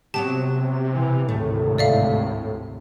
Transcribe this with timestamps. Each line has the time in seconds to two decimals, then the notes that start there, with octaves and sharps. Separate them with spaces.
0.14 C3 F#3 B3 G4 A5
0.92 B2 E3
1.29 G#1 D2 A2 C3 A3
1.78 D5 E5 F5